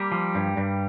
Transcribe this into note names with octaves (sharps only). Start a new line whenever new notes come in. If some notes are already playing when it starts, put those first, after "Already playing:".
Already playing: G3 A#3
F3
G2
G2